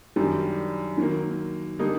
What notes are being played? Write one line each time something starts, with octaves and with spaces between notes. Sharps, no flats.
F#2 D#3 G3 D4
D#3 F#3 A#3
D3 G3 A#3 D#4